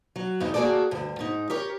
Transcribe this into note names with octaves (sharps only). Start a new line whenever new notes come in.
F#3
E2 G2 D#4
A#3 F#4 G#4 A4 D5
D2 G2
G#2 D#4
G4 A#4 C#5